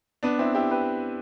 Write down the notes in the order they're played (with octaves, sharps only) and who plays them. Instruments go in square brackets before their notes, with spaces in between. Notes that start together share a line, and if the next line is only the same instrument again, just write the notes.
[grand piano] B3 D4
C4 E4
E4 G4
G4 B4